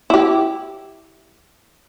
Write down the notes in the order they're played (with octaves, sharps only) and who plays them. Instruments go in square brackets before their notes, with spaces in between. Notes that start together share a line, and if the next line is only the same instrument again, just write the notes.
[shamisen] E4 G4